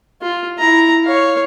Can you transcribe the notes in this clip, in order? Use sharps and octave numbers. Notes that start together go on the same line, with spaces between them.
F4
E4 A#5
C#5 F5